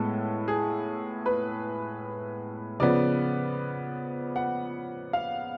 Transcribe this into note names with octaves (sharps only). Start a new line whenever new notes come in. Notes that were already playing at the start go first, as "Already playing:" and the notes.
Already playing: A2 G#3 B3 A4
G#4
B4
C#3 F3 B3 D5
F#5
F5